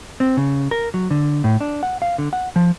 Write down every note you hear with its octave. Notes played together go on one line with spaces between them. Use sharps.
C4
C#3
A#4
F#3
D3
A2
D4
F#5
F5
D3
F#5
F3